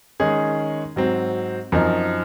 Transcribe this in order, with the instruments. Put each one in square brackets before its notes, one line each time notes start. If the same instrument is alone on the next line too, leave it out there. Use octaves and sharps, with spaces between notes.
[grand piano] D#3 G#3 C#4 G#4
G#2 F#3 C4
F#2 F3 C4 D#4